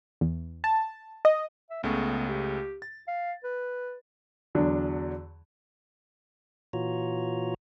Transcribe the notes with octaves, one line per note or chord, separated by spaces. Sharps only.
E2
A5
D#5
E5
C#2 C#3 A3 B3
G4
A6
F5
B4
E2 D3 F#3 D4
A#2 E3 F4 F#4 C#5 A#5